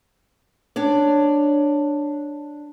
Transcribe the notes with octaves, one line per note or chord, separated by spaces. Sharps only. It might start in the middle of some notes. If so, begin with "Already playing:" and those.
D4 C#5 D5